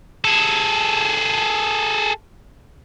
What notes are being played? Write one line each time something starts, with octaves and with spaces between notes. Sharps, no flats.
G#4 A4